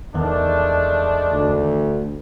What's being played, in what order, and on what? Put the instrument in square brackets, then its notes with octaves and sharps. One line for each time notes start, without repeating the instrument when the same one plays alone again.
[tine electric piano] E2 D#3 [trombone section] G#3 A3 D4
[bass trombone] D2